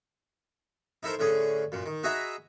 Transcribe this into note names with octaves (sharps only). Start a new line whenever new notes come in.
D#4 E4 A4 A#4 C5
A2 D3 C#4 G#4
F#2 A#2
D#3
F#4 G#4 D#5 E5 A#5 B5